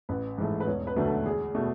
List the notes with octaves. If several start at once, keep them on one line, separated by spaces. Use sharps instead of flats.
A1 B4
G#2 E3 A3
B4
E1 C#5
B4
D2 D3 F#3 A3
A4
E2 G#4
B2 A3